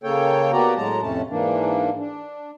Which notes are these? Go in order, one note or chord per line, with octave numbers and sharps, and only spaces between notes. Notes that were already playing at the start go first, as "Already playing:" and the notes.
C#3 A#3 A4 C#5 G5
A#3 B3 F#4 G4 D5 A#5
A2 F#3 G#3 A5 A#5
F2 A2 C3 A3 C#4 A5
G#2 E3 A#3 D4
D4